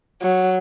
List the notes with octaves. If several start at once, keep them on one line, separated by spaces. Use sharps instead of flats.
F#3